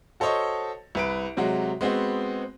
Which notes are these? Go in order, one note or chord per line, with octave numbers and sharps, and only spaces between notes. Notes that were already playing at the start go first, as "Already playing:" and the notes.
F#4 A4 C5 C#5 D#5
C2 B4 D7
C3 F#3 G#3 F#4
G#3 B3 C4 F#4